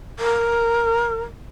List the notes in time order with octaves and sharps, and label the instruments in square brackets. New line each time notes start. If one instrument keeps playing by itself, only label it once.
[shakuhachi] A#4